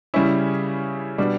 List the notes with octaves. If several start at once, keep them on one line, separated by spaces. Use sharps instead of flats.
C#3 G3 C#4 E4
B2 G3 D4